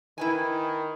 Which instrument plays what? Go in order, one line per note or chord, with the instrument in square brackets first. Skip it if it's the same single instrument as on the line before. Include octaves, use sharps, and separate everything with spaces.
[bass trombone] D#3 [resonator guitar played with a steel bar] E4 B4 G#5